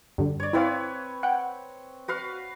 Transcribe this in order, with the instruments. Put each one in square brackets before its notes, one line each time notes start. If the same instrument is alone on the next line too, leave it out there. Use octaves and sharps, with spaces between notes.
[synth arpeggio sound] G2 D3
[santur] C#5 D5
[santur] C4 B4 C#5 [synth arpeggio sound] E4 F5
[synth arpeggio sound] F#5 G5
[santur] F#4 B4 F5